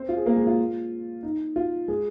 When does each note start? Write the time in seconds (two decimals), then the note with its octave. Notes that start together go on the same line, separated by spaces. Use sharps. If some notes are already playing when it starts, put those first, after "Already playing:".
Already playing: C4 C5
0.09 F4
0.17 G#4
0.26 A#3 A#4
0.37 G#3 G#4
0.47 F4
1.23 D#4
1.56 F4
1.88 G#3 G#4